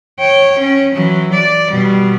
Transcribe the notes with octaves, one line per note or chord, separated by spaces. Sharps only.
C#5 G5
C#4
E3 F#3
D5
B2 G3